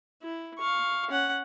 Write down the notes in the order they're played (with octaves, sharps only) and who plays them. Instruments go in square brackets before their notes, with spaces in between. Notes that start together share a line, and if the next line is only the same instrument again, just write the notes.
[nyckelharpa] E4
F5 C#6
C#4 F#5